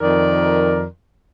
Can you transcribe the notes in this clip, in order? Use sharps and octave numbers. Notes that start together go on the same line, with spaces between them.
F2 D#3 A#4 D5